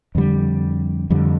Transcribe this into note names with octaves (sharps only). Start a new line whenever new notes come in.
F2 D3 G3
F2 D3 G3